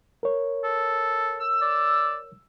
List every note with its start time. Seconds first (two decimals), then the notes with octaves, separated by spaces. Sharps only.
0.23 A#4 C#5
0.64 A4
1.39 E6
1.62 D5